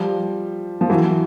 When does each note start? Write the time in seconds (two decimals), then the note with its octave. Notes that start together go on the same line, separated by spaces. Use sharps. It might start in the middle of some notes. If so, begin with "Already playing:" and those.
Already playing: F3 G3
0.81 F3
0.90 E3 F#3